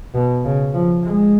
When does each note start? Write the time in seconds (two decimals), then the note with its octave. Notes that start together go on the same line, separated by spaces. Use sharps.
0.14 B2
0.44 C#3
0.73 F3
1.03 G#3